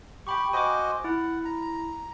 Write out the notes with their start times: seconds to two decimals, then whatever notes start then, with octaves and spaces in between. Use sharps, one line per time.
0.27 G4 G5 B5 C#6
0.53 F#4 C5 D#5 G#5 D6
1.04 E4 F#5
1.45 A#5